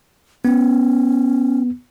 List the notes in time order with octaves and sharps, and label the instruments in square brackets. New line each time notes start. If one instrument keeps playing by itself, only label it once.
[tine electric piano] B3 [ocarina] C#4